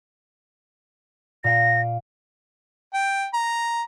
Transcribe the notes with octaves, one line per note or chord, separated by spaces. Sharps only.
A#2 F5 G5 A#6
G5
A#5